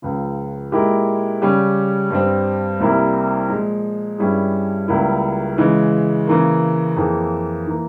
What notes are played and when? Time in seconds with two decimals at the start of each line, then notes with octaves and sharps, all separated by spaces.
0.02 C#2 C#3 F3
0.72 A#2 G#3 E4 G4 A#4
1.42 C#3 G3 C#4 G4
2.10 G2 G3 C4
2.80 C2 C3 G3 A#3 E4
3.49 A#2 F3 G#3
4.18 G2 G3 C#4 E4 G#4
4.88 C#2 C#3 G3 A#3 E4
5.58 C#3 E3 G#3
6.27 C#3 E3 A#3
6.96 F2 E3 A#3 F4 G#4
7.67 E3 A#3